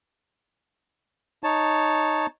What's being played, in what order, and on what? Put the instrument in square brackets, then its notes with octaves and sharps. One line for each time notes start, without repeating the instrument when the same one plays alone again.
[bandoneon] D#4 C#5 A5